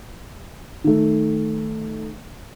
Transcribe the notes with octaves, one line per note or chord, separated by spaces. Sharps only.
D#3 A3